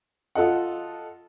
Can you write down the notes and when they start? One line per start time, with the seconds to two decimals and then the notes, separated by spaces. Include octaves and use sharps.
0.35 F4 A4 D#5 F#5